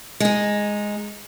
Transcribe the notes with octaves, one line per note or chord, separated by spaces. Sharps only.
G#3 D#4